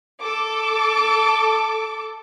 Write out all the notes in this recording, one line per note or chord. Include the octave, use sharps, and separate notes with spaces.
A4 D6